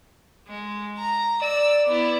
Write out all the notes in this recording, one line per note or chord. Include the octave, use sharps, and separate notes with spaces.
G#3
A#5
D5 E6
B3 E4